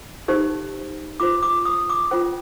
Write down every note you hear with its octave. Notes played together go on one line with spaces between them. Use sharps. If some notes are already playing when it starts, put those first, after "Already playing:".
D#4 G4 C5
F4 C5 D6
D6
D#6
D6
F4 C5 G5